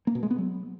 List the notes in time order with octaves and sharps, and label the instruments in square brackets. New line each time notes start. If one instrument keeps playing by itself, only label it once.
[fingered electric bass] A#3
B2
G#3
B3
F#3